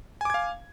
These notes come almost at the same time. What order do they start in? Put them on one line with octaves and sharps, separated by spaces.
G#5 D6 G#6 F5